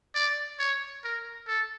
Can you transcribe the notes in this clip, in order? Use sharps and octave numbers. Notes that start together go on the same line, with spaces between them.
D5
C#5
A#4
A4